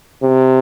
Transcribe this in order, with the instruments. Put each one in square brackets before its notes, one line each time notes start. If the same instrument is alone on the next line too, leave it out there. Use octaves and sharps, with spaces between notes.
[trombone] C3